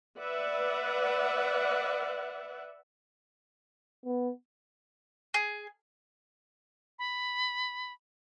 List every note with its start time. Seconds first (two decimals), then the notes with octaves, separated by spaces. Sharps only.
0.19 B4 D5 E5 F#5
4.05 B3
5.34 G#4
6.99 B5